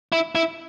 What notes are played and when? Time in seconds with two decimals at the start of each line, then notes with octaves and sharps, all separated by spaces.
0.12 E4
0.35 E4